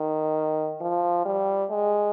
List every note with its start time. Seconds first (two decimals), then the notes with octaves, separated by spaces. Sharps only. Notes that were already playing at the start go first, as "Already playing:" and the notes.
Already playing: D#3
0.80 F3
1.25 G3
1.70 G#3